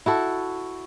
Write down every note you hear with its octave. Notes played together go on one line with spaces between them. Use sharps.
E4 F#4 A4